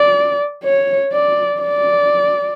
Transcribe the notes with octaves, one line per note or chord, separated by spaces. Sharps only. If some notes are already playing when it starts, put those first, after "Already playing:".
Already playing: D5
C#5
D5
D5